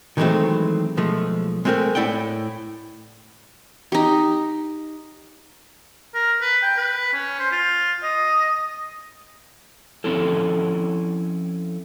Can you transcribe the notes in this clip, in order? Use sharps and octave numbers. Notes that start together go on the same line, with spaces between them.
D#3 E3 F#3 G#3 A3 C4
B1 F3 G#3 A3
G#3 A3 C4 G#4 A#4
A2 E4 D5 F#5 G5
D#4 G4
A#4
B4
G5
B4
C#4
C5
F4
D#5
F3 C4 C#4 E4 A4